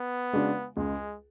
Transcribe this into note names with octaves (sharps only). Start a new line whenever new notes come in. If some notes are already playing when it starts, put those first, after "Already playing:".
Already playing: B3
C#3 G#3 D4 F#4
C#2 G#3